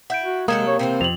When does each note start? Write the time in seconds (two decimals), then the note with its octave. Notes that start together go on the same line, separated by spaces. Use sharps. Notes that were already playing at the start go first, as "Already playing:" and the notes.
0.10 E4 F#5 G6 D7
0.23 F#4
0.48 C3 F#3 G#3 A#3 A4 D#6 G#6 E7
0.67 C#5
0.79 C3 E3 C4 C5
1.01 F2 F7 F#7